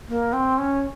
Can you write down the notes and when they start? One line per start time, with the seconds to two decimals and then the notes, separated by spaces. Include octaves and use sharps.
0.08 A#3
0.33 C4
0.58 C#4